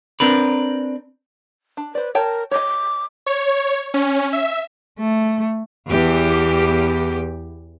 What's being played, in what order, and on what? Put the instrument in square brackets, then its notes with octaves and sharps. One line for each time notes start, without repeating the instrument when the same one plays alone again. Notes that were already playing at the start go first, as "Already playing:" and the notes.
[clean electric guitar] C4 D4 A#4 B4
[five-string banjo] D4
[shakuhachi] B4 [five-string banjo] C5 D5
[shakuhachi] A#4 [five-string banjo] C#5 G5 A5
[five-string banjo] C#5 D#5 [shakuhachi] D6
[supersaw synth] C#5
C#4
E5
[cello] A3
[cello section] E2 E3 G4